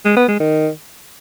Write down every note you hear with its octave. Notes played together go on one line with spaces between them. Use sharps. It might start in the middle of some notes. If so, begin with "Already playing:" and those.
G#3
B3
G#3
D#3